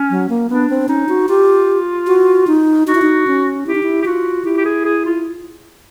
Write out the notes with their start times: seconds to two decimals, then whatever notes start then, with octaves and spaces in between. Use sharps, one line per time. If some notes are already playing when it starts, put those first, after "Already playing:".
Already playing: C#4
0.10 F#3
0.29 A#3
0.49 B3 D4
0.70 C4
0.89 C#4 D#4
1.09 F#4
1.28 F4 G4
2.07 F#4
2.47 D#4
2.87 D#4 F#4
2.95 E4
3.02 D#4
3.27 C#4
3.66 E4 G4
3.75 D#4
3.83 E4
4.02 G4
4.05 F4 F#4
4.45 E4 G4
4.57 G4
4.65 G#4
4.85 G#4
5.05 F4